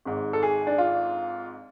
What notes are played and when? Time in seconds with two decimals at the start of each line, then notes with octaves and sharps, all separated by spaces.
0.05 G#1 G#2
0.33 A4
0.43 G#4
0.67 D4
0.78 F4